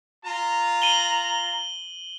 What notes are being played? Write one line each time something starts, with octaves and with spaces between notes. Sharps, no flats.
F4 A#5
D#7 F#7 G7